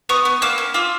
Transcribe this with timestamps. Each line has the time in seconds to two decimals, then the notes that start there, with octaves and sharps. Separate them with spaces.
0.09 B3 C#6 D#6
0.25 B3
0.42 A#3 D6 E6
0.58 C#4
0.74 F4 D6 E6